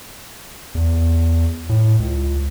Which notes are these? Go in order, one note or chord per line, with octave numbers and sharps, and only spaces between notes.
E2
A2
C#2